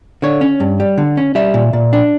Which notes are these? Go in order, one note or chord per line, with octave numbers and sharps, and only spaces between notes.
D3 C#5
C#4
G2
G3
D3
C#4
G3 E5
A#2
A#2
D4